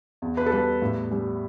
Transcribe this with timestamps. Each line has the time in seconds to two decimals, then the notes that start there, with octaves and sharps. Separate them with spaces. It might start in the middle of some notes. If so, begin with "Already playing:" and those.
0.22 E2
0.37 B4
0.46 A4
0.52 G3 B4
0.82 A2
1.11 G3